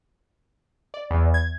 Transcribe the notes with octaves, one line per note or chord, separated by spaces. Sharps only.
D5
E2
G#6